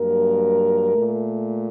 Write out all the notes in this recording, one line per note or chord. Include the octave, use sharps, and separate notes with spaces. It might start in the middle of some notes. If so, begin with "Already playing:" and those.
Already playing: G2 F#3 A#3 A#4
A#2 A3